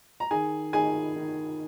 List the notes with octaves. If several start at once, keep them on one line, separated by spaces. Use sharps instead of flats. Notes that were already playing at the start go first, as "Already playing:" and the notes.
A#5
D#3 G#4 G#5
D#3 G#4 G#5
D#3